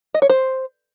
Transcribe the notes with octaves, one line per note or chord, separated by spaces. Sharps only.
D#5
C#5
C5